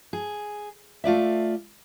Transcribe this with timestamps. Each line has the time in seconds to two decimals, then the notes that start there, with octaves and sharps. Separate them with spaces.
0.13 G#4
1.04 A3 F4 D5 E5